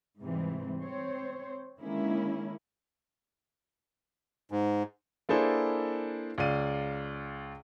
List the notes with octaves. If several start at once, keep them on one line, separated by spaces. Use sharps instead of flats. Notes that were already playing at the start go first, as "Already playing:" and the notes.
G#2 C3 E3 G3 G#3 C4
C4 C5 C#5
D3 D#3 G#3 A#3 C#4 E4
G#2
A#3 D4 E4 G#4 A4 C5
C#2 D5 F5 D#7